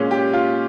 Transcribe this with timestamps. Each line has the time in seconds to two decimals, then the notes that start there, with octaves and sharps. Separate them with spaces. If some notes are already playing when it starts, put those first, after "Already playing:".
Already playing: A#2 G#3 C#4
0.11 G4
0.34 F4